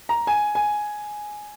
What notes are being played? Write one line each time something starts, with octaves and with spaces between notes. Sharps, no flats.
A#5
G#5
G#5